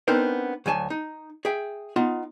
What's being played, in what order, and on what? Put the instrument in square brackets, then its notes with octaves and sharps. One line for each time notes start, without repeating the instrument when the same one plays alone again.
[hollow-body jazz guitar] B3 C4 D4 D#4 A#4 C5
D2 F#3 G#5 A5
D#4
G#4 E5 G5
B3 D#4 F4